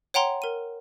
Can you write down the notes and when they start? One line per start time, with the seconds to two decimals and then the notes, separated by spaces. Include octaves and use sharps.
0.14 C#5 F#5 G5 A#5 C6
0.42 A#4 D#7